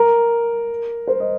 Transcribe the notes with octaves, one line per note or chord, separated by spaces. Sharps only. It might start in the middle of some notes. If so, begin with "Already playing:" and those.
Already playing: A#4
C5
D#5